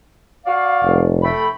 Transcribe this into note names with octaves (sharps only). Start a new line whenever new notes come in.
F#4 D5 F5
F1
A3 G5 B5